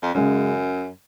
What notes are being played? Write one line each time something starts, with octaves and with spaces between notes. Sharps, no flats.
F2
F#2 C#3 G#3 C#4